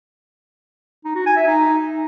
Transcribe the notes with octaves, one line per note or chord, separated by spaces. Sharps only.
D#4
F#4
G#5
E5
D#4